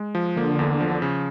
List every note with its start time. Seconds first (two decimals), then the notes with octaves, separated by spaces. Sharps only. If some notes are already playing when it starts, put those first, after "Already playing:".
Already playing: G#3
0.15 F3
0.36 D3 A#3
0.59 E2
0.81 F3
1.02 C#3